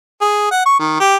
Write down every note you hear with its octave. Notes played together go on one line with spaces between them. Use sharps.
G#4
F#5
C#6
D#3
G4